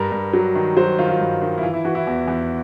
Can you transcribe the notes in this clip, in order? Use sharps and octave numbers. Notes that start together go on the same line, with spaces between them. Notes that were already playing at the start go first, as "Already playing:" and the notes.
Already playing: G2 A#4
G2
F#3
D#3
F#3 C5
D#3 F4
F4
G2
D#3
E4
E3 F4
E4
E3 F#4
E4
E2
E2